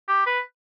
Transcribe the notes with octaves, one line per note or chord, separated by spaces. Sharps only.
G4
B4